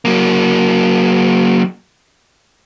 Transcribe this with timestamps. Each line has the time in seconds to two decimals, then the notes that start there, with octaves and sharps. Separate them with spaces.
0.05 F#3 A#3